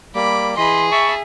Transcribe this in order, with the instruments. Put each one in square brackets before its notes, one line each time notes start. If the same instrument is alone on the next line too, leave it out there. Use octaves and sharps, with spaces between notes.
[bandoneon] G3 A#3 [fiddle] B5 D6
[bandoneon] E3 [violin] G#4 [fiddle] D#5 B5 [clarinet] C6
[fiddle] E5 [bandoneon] A5 B5 [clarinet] C#6